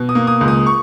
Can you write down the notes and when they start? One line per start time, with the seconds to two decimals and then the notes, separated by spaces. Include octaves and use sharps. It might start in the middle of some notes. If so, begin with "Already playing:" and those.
Already playing: B2
0.09 D#6
0.15 A#3
0.27 D#6
0.41 C#2
0.48 D#6
0.67 C#6